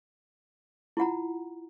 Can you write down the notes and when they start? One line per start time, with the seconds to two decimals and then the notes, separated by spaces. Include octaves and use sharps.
0.97 E4 F4 F#5 A#5